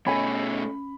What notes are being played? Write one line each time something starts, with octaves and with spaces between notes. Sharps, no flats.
B2 A3 C#4 C#5 D#5 G#5 B5